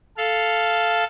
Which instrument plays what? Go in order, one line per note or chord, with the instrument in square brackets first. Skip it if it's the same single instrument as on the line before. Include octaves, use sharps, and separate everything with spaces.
[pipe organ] A4 F5